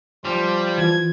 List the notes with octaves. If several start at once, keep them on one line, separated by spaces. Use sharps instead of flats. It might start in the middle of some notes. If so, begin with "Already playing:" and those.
F3 G3 C6
E3 F4 G#6